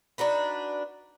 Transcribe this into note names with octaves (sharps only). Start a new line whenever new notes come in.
D4 D#4 F#4 B4